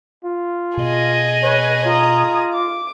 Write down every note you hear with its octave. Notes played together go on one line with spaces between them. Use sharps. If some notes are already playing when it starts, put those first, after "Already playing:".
F4
B2 G#4 D#5
B4 C#5
F4 A#5 D#6
D6